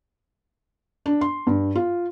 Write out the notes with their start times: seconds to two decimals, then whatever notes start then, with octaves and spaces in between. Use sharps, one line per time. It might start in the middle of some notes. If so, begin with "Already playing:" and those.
1.06 D4
1.21 C6
1.47 G2
1.75 F4